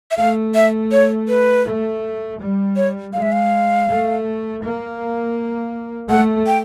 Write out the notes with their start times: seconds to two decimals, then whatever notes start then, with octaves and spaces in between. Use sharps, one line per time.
0.11 E5
0.17 A3 F5
0.55 E5
0.92 C#5
1.28 B4
1.65 A3
2.39 G3
2.76 C#5
3.13 G#3 F5
3.22 E5
3.32 F5
3.87 A3
4.62 A#3
6.10 A3 F#5
6.47 G5